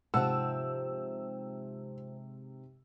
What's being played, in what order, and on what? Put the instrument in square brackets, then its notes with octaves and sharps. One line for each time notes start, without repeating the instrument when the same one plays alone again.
[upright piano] G#2 C3 [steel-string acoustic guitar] F3 C4 [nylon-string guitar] F#5 A5 [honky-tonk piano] E6